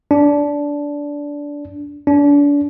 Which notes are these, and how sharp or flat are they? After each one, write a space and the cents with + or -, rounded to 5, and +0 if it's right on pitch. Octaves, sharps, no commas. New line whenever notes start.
D4 -15
D4 -35